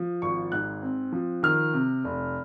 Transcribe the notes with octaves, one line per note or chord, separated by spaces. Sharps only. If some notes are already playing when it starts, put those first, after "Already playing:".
Already playing: F3
G#1 C#6
G#2 F#6
C4
F3
D#3 F6
C3
F1